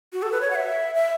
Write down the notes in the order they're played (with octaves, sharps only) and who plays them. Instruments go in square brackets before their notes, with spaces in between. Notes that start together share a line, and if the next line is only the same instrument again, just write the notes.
[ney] F#4
A4
B4
C#5
F#5
E5
E5